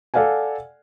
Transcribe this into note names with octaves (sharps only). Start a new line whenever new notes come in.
A4 D5 F5 F#5 G#5